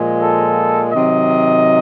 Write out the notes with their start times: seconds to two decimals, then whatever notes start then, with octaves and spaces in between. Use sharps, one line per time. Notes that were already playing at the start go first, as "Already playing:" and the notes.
Already playing: A#2 F3 G#3
0.22 A4
0.91 C3 D#3 F#3 D#5